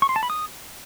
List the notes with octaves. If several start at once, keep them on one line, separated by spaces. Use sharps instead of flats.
C#6
C6
A5
B5
D#6